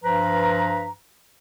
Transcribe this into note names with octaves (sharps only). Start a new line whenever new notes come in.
G2 F3 B4 A#5